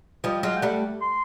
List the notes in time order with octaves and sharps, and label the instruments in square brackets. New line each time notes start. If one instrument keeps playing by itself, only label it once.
[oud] F3 G3 [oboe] D#5
[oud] F#3 G#3 [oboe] F5
[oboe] G5
[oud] G3 A3 [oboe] F#5
[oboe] C6